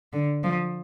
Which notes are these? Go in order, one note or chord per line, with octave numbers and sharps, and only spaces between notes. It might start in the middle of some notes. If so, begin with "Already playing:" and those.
D3
F3